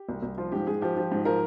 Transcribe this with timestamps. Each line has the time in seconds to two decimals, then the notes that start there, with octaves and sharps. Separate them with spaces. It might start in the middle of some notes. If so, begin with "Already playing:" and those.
Already playing: G4
0.09 C2
0.22 C2
0.38 F3 F4
0.52 G#2 G4
0.67 G#2 G#4
0.81 F3 G4
0.97 F3
1.12 G#2
1.25 F3 A#4